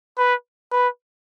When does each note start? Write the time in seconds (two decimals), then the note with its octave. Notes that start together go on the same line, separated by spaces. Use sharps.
0.18 B4
0.72 B4